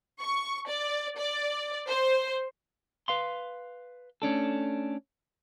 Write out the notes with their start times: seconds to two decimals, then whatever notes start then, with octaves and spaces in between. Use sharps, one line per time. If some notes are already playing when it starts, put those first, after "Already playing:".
0.21 C#6
0.68 D5
1.18 D5
1.87 C5
3.08 B4 F5 C6
4.22 A3 C#4 D4 A4